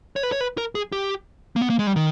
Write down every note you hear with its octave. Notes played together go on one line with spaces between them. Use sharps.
C#5
B4
C#5
B4
A#4
G#4
G4
A#3
B3
A#3
G#3
G3
D#3